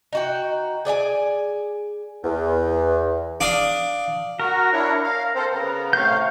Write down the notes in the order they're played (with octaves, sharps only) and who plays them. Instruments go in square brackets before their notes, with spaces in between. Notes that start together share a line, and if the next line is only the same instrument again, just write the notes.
[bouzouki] D#4 F#4 G5
G#4 D5 D#5 G#5
[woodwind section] E2
[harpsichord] D4 F5 D#6
[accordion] F#4 [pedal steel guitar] A#4
[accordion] D4 E4 C#5
F5
C4 A4 C5
C#3 B3
[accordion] A2 C3 F5 [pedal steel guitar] C#6 G6